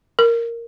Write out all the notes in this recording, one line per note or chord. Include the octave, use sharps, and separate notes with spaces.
A#4